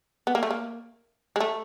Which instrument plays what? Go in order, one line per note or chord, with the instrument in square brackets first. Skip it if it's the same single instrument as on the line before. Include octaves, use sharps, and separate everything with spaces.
[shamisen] B3
A#3
A3
A#3
G#3
A3